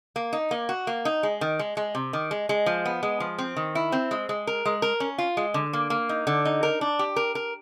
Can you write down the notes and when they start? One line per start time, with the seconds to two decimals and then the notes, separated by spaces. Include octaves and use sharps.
0.16 A#3
0.33 D#4
0.51 A#3
0.69 F#4
0.87 A#3
1.05 D#4
1.23 G#3
1.41 D#3
1.59 G#3
1.77 G#3
1.95 C3
2.13 D#3
2.31 G#3
2.49 G#3
2.66 F3
2.85 B3
3.03 G#3
3.20 F3
3.38 C4
3.57 D#3
3.75 E4
3.92 C4
4.11 G#3
4.29 G#3
4.47 A#4
4.65 G#3
4.82 A#4
5.00 C#4
5.18 F4
5.37 G#3
5.54 D3
5.73 A#3
5.90 A#3
6.09 D#4
6.27 D3
6.45 D#4
6.63 A#4
6.81 D4
6.99 G4
7.16 A#4
7.35 A#4